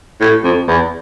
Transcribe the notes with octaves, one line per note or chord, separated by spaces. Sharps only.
A2
F2
E2